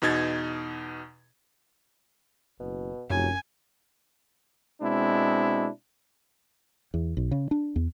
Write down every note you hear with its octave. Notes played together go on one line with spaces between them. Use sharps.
E2 B2 D#4 G#6 A6
F#1 B2
F1 F#2 F#3 G#5
B2 G#3 C4 D4 E4
E2
B1
C#3
D4
E2